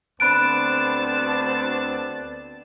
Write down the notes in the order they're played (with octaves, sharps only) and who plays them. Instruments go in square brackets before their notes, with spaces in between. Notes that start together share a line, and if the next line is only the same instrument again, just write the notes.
[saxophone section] D2 C4 [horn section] B3 D4 A5 [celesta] B5 F#6 D7